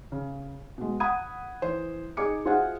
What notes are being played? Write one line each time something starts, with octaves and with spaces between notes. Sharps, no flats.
C#3
B2 G#3
F#5 B5 D#6 G#6 D#7
E3 C5
D#4 G#4 D6 C#7
F4 F#4 G#4 C5 E5 F#5